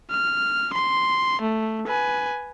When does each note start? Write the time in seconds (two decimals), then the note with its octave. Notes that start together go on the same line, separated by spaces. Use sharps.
0.11 F6
0.73 C6
1.41 A3
1.88 B4 G#5